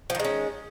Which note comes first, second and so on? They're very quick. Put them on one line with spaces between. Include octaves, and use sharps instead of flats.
F3 D#3 G#3 C#4